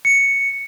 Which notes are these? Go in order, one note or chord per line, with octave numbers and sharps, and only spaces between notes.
C#7